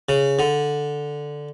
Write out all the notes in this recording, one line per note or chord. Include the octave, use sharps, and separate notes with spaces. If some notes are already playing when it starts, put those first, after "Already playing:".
C#3
D3